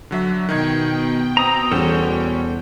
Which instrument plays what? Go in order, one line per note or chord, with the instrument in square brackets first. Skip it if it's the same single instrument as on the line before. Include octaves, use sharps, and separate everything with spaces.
[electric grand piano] D3 F#3 E5
[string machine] B2 G5 [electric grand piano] D#3 D#4 G#6
[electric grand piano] C4 [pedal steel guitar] A#5 D#6
[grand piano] E2 [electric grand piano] G3 C#4 F#4 [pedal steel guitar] A4 C5